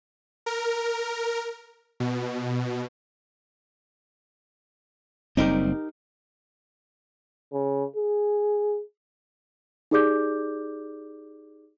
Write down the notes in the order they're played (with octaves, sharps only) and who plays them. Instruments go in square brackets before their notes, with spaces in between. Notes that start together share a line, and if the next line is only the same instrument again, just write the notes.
[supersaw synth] A#4
B2
[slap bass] F#1 G3 C4 [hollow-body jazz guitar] D#4 G4 A#4
[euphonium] C#3
G#4
[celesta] D#4 G4 G#4 D5 D6 G6